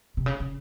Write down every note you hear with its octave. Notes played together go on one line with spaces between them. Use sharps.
C3
C#3
C#3